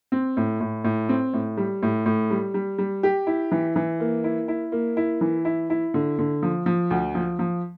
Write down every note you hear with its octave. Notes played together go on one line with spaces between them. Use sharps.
C4
A2
A2
A2
C4
A2
G3
A2
A2
G3
G3
G3
G4
E4
E3
E3
A#3
E4
E4
A#3
E4
E3
E4
E4
D3
D3
F3
F3
D2
F3
F3